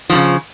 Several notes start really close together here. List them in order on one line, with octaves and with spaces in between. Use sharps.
F3 A2 C#3